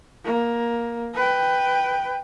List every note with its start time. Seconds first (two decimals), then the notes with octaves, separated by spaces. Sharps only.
0.24 A#3
1.15 B4 G5